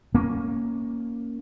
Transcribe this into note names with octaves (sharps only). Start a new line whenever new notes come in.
A#3 C#4